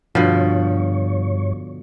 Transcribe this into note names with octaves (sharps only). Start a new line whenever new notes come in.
G2 B2 D3 F3 C#5